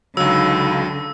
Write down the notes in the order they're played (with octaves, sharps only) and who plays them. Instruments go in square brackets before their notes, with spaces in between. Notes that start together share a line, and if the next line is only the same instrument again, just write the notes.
[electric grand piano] C#2 F#3 [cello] D3 [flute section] D#4 F5 B5 [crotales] E6